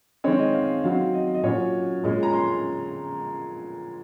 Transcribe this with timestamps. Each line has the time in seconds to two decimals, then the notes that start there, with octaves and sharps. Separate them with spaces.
0.24 D#3 G#3 C4 C#5
0.39 D#5
0.54 F5
0.84 D#3 F#3 C4 F5
1.14 D#5
1.34 D#5
1.43 A#2 F#3 C#4 C#5
2.04 A#2 G#3 C#4
2.23 A#5
2.33 C6